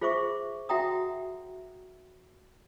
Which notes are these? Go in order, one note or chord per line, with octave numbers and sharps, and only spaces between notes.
F4 G#4 C5 E5 C#6 D6
F#4 E5 F#5 G5 A#5 D#6